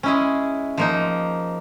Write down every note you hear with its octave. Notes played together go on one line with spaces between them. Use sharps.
G#3 C#4 E4 G#4
F3 A#3 D#4